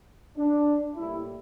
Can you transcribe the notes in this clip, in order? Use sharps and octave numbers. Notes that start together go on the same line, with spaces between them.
D4
A2 G3 A#3 E4